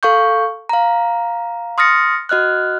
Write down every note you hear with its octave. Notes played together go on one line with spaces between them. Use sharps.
A4 F5 C#6 G6
F5 A#5
C6 D#6 F6 A6 A#6 C#7
F#4 D#5 F6 F#6